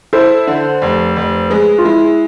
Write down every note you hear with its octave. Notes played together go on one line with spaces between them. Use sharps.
E4 A4 C5
D3
F1
F1
G#3 G#4 B4
F4
G#3 E4 G#4